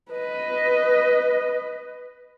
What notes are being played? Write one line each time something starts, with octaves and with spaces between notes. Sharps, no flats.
B4 D#5